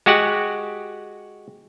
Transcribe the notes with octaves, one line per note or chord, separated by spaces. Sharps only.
G#3 F#4 G4 F#5